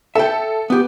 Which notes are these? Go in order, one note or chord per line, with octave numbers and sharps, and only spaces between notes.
A4 E5 G5
B3 G4